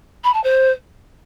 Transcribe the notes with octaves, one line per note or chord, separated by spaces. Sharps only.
B5
A5
C5